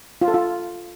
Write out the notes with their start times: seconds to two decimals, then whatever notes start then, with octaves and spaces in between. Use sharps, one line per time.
0.22 F4
0.28 A4
0.34 F4